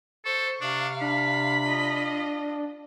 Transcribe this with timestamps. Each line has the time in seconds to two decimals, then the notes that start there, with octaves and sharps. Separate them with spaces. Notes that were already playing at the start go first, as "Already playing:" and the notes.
0.25 A4 C5 C#6
0.61 C3 D4 F5
1.01 D4 B5
1.64 F4 D#5